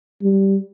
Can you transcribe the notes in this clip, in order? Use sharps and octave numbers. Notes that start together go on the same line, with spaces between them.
G3